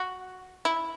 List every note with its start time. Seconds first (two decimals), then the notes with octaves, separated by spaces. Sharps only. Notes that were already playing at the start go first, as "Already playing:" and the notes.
Already playing: F#4
0.65 E4